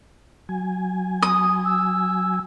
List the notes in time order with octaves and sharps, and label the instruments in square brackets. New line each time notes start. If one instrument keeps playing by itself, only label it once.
[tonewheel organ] F#3 G#5
[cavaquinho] D#6
[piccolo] E6